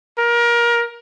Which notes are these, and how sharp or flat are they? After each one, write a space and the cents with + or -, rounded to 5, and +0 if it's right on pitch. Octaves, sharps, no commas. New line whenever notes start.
A#4 +25